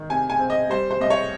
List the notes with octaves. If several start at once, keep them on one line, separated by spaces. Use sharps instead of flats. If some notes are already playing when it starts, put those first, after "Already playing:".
Already playing: D#3
C3 G#5
G#5
C4
D#5
G3 C5
C5
C2 D#5
C#5